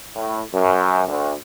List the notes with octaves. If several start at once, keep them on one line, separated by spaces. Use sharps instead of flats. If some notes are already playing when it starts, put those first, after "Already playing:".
A2
F#2
D2